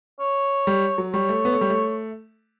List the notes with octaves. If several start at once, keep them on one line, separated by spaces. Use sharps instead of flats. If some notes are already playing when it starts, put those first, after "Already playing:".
C#5
G3
F#3
G3 C#5
A3
B3
A3
G3
A3